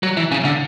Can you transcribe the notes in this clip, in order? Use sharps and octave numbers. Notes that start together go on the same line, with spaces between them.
F#3
E3
C#3
D3